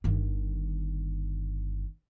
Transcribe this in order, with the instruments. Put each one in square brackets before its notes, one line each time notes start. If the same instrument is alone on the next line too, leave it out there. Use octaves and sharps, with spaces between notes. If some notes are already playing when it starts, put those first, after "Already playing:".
[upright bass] G1 D#3